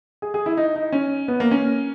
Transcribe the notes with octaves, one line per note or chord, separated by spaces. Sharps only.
G#4
G#4
E4
D#4
D#4
C#4
B3
A#3
C#4